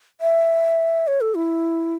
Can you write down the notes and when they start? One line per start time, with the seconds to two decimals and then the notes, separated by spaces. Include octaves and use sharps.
0.21 E5
1.07 C#5
1.21 A4
1.35 E4